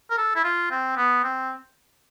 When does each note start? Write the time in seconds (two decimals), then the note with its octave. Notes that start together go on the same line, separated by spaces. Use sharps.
0.10 A#4
0.18 A4
0.36 E4
0.44 F4
0.71 C4
0.97 B3
1.24 C4